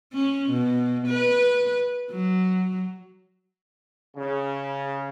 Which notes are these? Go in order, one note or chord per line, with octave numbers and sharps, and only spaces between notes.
C#4
B2
B4
F#3
C#3